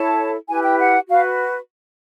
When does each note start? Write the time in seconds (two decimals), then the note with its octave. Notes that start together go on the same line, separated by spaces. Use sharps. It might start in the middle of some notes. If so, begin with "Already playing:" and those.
Already playing: E4 A4 C#5 A5
0.48 E4 G4 B4 G#5
0.63 G5
0.79 F#5
1.08 F#4 B4 F5